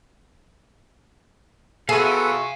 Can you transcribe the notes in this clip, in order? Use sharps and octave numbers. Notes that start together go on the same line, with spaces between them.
B3 F4 F#4 G#4 A4 E5 F5 G#5